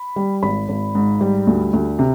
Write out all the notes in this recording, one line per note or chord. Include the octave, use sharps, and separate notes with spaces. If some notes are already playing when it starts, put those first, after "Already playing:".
Already playing: B5
G3
G#1 B5
G#1
G#2
G3
D2
D2
C3